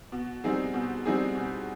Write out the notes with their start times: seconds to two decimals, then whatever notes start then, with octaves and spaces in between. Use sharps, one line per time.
0.12 B2
0.44 G3 C4 D#4 G#4
0.74 B2
1.05 G3 C4 D#4 G#4
1.35 B2